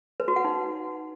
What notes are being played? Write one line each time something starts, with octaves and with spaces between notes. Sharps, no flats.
B4
F#4
F#5
D#4